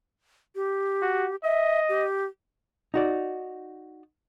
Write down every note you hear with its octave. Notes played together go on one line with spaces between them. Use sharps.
G4
F#4
D#5 E5
G4
D#4 F#4 D5